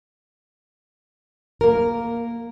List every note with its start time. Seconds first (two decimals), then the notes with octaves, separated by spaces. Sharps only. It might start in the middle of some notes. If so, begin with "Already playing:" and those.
1.61 A#3 A#4